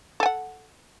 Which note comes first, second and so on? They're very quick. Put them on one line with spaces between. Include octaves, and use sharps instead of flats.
A4 G#5 F#5